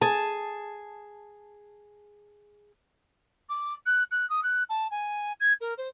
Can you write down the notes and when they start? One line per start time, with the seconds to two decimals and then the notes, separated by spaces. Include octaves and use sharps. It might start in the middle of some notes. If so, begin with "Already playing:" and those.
0.01 G#4 A5
3.49 D6
3.86 F#6
4.11 F#6
4.29 D#6
4.43 F#6
4.69 A5
4.91 G#5
5.40 G#6
5.61 A#4
5.78 C5